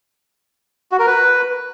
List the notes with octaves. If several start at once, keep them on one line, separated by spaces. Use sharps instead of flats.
F#4
A#4
B4